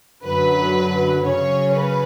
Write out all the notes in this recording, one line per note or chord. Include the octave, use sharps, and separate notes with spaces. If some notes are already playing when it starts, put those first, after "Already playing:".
F#2 D3 F#3 B4
C#3 F#3 C#4 C#5
B4